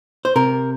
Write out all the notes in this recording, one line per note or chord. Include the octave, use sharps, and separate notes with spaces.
C5
C3 A#4